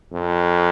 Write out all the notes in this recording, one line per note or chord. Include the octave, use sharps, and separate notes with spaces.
F2